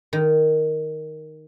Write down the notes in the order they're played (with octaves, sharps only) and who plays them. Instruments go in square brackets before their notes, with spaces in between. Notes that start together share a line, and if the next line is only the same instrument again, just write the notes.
[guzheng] D#3